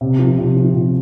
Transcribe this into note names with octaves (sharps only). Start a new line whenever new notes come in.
C3
F3
C3
F3
C3